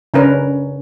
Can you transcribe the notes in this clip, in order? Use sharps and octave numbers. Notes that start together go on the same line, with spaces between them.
C#3 C#4 D4 A#4 B4